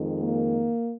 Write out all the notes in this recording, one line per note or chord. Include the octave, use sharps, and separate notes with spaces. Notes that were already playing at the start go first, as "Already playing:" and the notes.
Already playing: F2 D#3 G#3
A#3